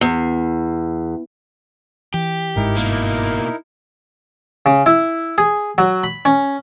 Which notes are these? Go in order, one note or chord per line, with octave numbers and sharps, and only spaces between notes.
E2
E3 G4
G1 G#2 G#3 D#4 E4 A#4
B2 A#3
C#3
E4
G#4
F#3
B5
C#4